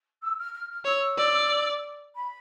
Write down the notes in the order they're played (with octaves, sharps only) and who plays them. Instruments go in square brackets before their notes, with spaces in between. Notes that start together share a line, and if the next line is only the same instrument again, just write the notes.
[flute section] E6
F6
F6
F6
[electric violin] C#5 [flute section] E6
[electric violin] D5
[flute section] B5